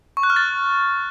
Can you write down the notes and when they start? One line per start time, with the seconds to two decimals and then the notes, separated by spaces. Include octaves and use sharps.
0.17 C#6
0.23 F#6
0.30 F6
0.36 A6